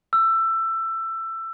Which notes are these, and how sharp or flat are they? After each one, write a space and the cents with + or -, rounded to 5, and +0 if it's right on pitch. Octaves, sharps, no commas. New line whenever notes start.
E6 +20